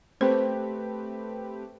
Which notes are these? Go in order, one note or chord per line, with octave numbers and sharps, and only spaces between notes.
A3 C4 G4 B4 C5